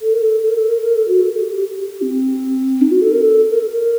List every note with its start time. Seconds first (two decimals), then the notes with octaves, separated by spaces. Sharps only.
0.01 A4
0.13 A#4
0.22 A4
0.42 A4
0.49 A#4
0.55 A4
0.68 A#4
0.81 A#4
0.95 A4
1.08 F#4
1.22 A4
1.34 A4
1.42 G4
1.61 G4
1.81 G4
2.02 C4
2.81 D#4
2.91 F#4
3.01 A4
3.11 A#4
3.21 A4
3.50 A#4
3.60 A4
3.70 A#4